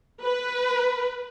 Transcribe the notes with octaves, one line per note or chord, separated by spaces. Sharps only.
B4